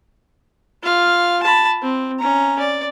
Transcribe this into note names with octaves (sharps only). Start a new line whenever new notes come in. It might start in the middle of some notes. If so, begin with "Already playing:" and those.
F4 F5
A5 B5
C4
C#4 A#5
D5